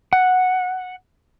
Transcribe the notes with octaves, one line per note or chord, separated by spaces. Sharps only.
F#5